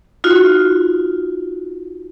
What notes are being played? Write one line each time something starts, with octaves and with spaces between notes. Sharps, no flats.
D#4 F4 F#4